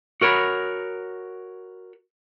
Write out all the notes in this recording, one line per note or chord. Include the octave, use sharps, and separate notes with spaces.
F#4 A#4 C#5 B5